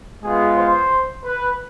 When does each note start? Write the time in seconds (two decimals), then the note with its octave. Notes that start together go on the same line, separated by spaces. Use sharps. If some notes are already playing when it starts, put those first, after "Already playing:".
0.23 G#3 B3 F4 G#4
0.58 C5
1.25 B4